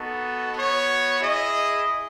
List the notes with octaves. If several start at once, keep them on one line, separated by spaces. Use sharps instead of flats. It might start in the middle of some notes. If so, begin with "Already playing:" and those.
Already playing: B3 D#4 F#4 A4
B3 F#4 C#5
E4 G#4 D#5